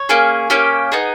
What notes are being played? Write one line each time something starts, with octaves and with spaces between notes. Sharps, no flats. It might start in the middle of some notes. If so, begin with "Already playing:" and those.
Already playing: C#5
A#3 C#4 G#4
A#3 C#4 G4
B3 D#4 G#4